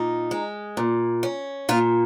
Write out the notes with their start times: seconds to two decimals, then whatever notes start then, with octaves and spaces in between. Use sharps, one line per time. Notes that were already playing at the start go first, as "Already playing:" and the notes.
Already playing: A#2 D#4
0.31 G#3
0.77 A#2
1.23 C#4
1.69 A#2 F4